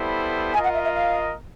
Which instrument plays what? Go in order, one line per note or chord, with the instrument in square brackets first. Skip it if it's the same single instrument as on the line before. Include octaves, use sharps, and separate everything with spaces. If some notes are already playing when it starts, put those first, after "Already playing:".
Already playing: [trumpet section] G3 B3 E4 A4 C5
[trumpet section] F4 A#4 D#5 [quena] G#5
[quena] F#5
E5
E5
F5